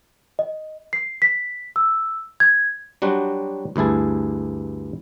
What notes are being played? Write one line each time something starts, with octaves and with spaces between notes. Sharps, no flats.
D#5
C7
B6
E6
G#6
F#3 G3 D4 F#4 C5
D2 G2 E4 G#4 A5